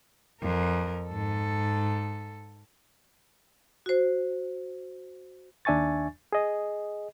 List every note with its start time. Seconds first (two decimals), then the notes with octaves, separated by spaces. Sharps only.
0.42 F2 A#4
1.09 G#2 A4
3.86 F#4 C5
5.65 D#2 D4 E5 G#5 C#6 A6
6.33 G#4 D#5